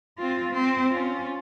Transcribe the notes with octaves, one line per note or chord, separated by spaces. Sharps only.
C4 F4
C4
C#4 F4